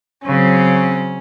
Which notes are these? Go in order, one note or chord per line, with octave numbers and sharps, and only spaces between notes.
C#3 F#3 C4 C#4